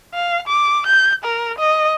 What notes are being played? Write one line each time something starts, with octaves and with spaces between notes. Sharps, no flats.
F5
D6
G6
A#4
D#5